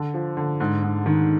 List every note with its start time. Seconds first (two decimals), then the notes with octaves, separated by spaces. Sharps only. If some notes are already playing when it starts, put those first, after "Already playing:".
Already playing: D3
0.14 F3
0.37 D3
0.60 G#2
0.83 G#2
1.06 D#3